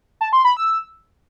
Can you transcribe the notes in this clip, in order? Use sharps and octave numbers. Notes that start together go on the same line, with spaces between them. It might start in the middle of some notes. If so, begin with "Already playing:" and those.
A5
C6
B5
E6